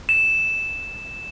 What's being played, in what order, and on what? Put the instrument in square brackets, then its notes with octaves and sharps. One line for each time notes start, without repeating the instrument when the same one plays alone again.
[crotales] E7